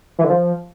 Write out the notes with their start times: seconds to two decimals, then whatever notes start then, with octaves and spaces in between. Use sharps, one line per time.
0.19 E3
0.24 D3
0.30 F3